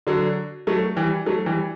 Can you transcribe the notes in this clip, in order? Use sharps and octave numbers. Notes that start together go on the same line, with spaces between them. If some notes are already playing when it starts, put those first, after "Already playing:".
D3 F#3
F#3 A3
E3 G3
F#3 A3
E3 G3